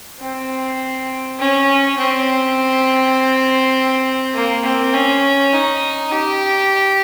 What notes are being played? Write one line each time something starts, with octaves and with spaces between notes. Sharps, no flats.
C4
C#4
C4
A#3
C4
C#4
D#4
G4